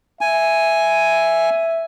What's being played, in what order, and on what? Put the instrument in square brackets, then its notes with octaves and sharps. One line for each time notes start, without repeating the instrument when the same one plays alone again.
[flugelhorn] E5 [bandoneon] G#5